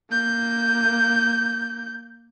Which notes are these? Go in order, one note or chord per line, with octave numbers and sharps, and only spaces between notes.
A#3 G6